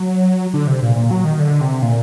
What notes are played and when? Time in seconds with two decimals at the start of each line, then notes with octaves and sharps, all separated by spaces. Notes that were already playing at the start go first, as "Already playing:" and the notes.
Already playing: F#3
0.54 D3
0.67 C3
0.82 A#2
0.96 A#2
1.11 F#3
1.24 D#3
1.39 D3
1.61 C3
1.82 A#2